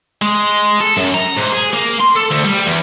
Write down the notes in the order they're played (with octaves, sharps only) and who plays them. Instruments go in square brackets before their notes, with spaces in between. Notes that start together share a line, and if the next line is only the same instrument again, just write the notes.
[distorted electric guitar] G#3
A4
F#2
A#5
G#2
G#4
A#3
C6
A4
D2
G3
E2